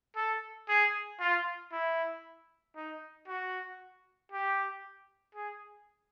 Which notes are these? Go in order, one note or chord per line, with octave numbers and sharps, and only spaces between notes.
A4
G#4
F4
E4
D#4
F#4
G4
G#4